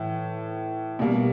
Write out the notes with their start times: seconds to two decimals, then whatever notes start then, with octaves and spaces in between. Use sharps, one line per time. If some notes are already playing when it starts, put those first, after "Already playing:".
Already playing: A2 E3
0.99 B2 G3 A#3